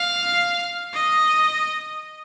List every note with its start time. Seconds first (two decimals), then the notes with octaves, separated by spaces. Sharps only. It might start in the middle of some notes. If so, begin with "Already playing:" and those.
Already playing: F5
0.93 D#5